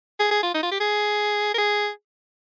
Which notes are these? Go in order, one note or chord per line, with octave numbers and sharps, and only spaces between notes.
G#4
G#4
F4
D#4
F4
G4
G#4
A#4
G#4